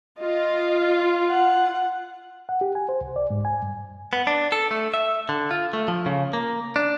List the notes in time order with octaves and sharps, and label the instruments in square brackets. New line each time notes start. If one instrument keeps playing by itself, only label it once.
[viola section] F4 [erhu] D#5
[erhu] F#5
[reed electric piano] F#5
G4
G#5
C5
C2
D5
G#2
G#5
G2
[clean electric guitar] B3
D4
A4
A3
E5
D3
F4
A3
F3
C#3
A#3
D4